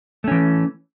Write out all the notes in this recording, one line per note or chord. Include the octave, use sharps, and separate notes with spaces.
E3 A3 C#4